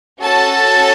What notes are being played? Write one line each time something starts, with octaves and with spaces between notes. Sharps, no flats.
C#4 F#4 A4 A5